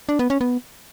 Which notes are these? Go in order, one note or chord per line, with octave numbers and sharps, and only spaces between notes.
D4
B3
C#4
B3